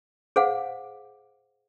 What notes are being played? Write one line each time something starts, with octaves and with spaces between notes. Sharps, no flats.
G#4 C5 F5 F#5